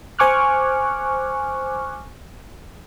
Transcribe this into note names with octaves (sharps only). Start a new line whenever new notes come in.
C5 G#5 C#6 D6 F6 F#6